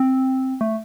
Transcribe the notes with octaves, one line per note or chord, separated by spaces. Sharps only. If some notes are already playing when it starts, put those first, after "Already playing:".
Already playing: C4
A3